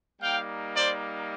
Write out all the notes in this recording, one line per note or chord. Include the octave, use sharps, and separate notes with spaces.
G3 A#3 D#4 F5 G5
C5 D5